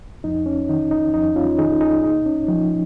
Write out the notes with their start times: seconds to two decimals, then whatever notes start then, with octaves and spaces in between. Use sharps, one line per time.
0.24 F2 D#4
0.46 C#4
0.69 D#3 D#4
0.91 D#4
1.14 F2 D#4
1.36 C#4 F4
1.58 D#3 D#4 G#4
1.81 D#4 G#4
2.04 A#2 D#4
2.26 C#4
2.48 F3 D#4